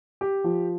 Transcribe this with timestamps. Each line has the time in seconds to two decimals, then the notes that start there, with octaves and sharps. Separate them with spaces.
0.21 G4
0.44 F3